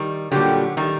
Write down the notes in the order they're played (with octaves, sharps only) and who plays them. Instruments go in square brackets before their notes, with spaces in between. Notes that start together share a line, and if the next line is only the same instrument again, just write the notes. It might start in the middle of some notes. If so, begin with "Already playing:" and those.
Already playing: [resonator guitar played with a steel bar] D#3 G3
[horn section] A#2 G3 D4 G4 [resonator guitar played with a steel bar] D3 F#3
[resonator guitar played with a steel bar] D#3 G3